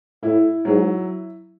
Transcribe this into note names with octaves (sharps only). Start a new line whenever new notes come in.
A2 E4
G#2 F#3